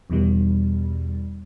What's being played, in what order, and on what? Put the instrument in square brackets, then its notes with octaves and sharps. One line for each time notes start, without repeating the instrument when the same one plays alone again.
[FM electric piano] E2 B2 D#3 G3